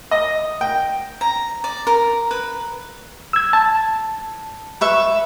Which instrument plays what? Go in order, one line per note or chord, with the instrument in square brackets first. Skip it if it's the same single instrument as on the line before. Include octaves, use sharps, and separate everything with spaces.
[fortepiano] D#5
G5
[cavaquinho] A#5
D5
A#4
B4
[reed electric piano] E6 G#6
A5
[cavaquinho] B4 E5 C#6